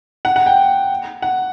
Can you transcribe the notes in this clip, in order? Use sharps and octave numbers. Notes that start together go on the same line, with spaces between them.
F#5
F#5
G5
F#5